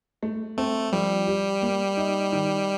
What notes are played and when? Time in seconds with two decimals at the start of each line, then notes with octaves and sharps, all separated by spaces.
0.23 A3
0.57 A3 C4
0.92 F3 G3
1.27 G4
1.62 A#3
1.97 D#4
2.32 D#3